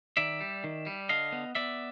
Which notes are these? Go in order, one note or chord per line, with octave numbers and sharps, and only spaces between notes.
D#3 D5 E5
G3
D#3
G3
D3 D#5 F5
B3
B3 D5 E5